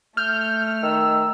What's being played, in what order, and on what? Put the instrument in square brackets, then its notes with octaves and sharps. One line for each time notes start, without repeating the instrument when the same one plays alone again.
[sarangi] A3 [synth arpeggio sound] F6 [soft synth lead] G6
[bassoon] D#3 [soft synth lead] E6